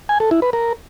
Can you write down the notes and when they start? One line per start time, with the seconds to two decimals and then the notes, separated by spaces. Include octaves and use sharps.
0.09 G#5
0.20 A4
0.31 E4
0.42 B4
0.53 A#4